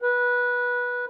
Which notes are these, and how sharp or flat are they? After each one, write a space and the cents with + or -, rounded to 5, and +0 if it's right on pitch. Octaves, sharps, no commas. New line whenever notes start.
B4 -15